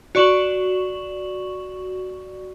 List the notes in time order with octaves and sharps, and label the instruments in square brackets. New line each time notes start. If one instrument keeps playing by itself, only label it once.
[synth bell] F#4 D5 C#6 E7 F#7